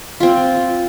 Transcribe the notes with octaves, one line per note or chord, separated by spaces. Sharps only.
C4 F4